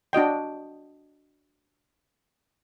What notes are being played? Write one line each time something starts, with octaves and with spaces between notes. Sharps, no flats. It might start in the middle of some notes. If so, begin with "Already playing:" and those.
D4 F#4 D#5 G5